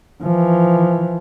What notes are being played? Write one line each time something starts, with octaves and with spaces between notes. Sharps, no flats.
E3 F3